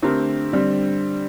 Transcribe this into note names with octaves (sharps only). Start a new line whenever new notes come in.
D3 A3 C4 G4 A#4
D3 G3 C4